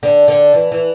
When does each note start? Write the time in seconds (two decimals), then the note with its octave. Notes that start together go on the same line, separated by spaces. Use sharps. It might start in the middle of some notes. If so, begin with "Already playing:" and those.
0.03 D3
0.28 D3
0.54 E3
0.72 E3